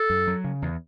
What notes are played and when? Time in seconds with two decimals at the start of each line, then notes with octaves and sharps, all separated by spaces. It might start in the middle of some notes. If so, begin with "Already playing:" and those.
Already playing: A4
0.10 F#2
0.27 F#3
0.44 C#3
0.62 E2